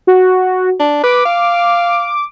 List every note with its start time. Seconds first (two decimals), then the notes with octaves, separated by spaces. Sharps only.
0.07 F#4
0.80 D4
1.03 B4 D6
1.25 F5